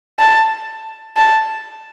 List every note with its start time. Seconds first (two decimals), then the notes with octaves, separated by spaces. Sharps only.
0.19 A5
1.16 A5